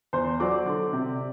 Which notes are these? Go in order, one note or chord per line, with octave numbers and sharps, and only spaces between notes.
E2 C5 C6
F#3 D5 D6
D3
C3